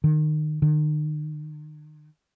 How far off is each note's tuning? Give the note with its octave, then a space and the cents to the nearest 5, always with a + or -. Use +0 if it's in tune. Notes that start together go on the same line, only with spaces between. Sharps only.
D#3 -25
D#3 -40